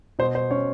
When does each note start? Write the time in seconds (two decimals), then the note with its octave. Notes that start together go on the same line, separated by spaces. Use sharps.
0.19 B2 C5
0.35 C5
0.51 C#4 C#5